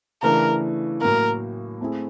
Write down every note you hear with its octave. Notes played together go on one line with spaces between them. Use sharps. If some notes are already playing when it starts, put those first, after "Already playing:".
C#3 E3 A3 D4 A#4
A2 F#3 A#3 A#4
A3 C4 E4 G#4